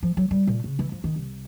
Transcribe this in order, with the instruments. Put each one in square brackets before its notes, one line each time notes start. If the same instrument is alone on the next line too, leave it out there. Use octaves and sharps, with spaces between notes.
[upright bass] F3
F#3
G3
A#2
C#3
E3
F3
D#3
C2